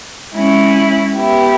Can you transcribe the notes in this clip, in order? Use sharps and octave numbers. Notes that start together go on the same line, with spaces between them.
G#3 C#4 E4
B3 E4 G4